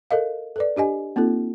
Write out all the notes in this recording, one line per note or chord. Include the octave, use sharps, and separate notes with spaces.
A4 A#4 D#5 F5
A4 B4 D5
D4 G4 D#5 G#5
A#3 C4 D#4 F4 A4